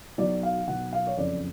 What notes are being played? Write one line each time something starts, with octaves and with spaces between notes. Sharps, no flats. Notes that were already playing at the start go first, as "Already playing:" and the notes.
B1 B2 F#3 D5
F5
B1 B2 F#3 F#5
F5
C#5
F#1 F2 C#3 D5